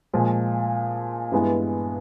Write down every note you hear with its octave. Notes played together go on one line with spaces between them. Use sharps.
A#2 F3 G#3
G2 E3 G#3 B3